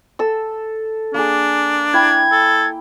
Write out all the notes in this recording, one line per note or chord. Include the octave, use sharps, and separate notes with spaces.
A4 E6
A#3 D4 G#4
E4 G5 G#6
A4